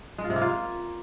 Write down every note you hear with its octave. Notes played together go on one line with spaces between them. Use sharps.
G#3
F4
C3
A#3
F4